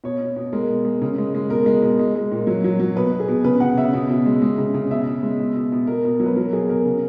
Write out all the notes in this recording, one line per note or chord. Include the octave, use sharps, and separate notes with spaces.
B2 C#5
B2
B2
G#3 A#4
B2
G#3
C#3
G#3
G#3
B2 A#4
G#3
B2
G#3
G#3
A#2
F#3
F#3
F#3
B2 B4
B2
G#4
B2
C#3 B4
C#3 F#5
C#3 E5
B2
B2
G#3
G#3
C#3
C#3
B2 E5
B2
G#3
B2
B2
B2
B2 A#4
B2
F#3
B4
F#3 A#4
B2 G#4
B2 A#4
C#3